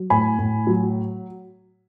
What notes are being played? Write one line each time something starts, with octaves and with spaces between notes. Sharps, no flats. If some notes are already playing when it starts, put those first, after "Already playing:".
Already playing: F#3
A2 G#5 B5
A2
F#3